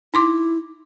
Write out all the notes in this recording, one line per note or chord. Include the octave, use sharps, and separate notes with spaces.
D#4 E4 C6 D6